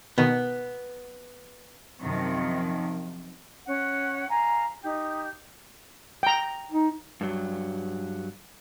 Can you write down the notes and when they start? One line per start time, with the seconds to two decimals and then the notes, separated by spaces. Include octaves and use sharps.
0.18 B2 D#3 B3
2.01 F#2 C3 D#3 F3
3.67 C#4 F#5
4.30 F5 G#5 A#5
4.83 D#4 G4
6.23 G5 A#5
6.72 D#4
7.21 G2 F#3